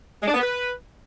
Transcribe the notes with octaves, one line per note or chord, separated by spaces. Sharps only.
G#3
D4
B3
B4